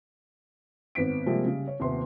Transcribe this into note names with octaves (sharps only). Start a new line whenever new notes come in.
G#1 B3 B6 D7
C3 F3 G3 G#3 A#3 C4
C#3 G3
C#5
D#1 C3 B3 C6